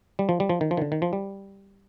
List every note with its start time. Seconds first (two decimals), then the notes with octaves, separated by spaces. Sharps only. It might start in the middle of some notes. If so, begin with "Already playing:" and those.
0.19 G3
0.29 F3
0.40 G3
0.49 F3
0.61 D#3
0.71 F3
0.77 D#3
0.82 D3
0.92 D#3
1.02 F3
1.13 G3